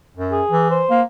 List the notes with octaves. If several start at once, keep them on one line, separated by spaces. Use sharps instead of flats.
F#2
G#4
E3
C5
A#3